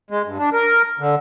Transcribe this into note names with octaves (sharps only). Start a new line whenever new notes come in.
G#3
G2
D4
A#4
D3